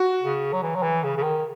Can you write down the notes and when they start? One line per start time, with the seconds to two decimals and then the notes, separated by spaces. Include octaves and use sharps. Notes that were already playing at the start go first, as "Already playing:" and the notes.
Already playing: F#4
0.22 C#3
0.53 F#3
0.63 E3
0.76 F#3
0.83 E3
1.03 C#3
1.17 C#3
1.23 D#3